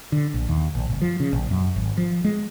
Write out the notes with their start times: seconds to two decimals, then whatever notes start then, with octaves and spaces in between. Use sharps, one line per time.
0.12 D3
0.34 A#1
0.49 D#2
0.75 A#1
0.90 G1
1.02 F3
1.20 C#3
1.33 A#1
1.51 F#2
1.76 G#1
1.97 F3
2.24 G#3